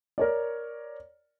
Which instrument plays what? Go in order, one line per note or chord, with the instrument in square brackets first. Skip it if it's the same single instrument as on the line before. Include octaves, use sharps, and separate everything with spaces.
[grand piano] A#4 C#5 D5